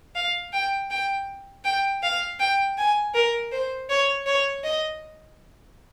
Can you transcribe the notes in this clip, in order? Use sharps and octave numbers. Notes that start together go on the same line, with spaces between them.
F5
G5
G5
G5
F5
G5
G#5
A#4
C5
C#5
C#5
D#5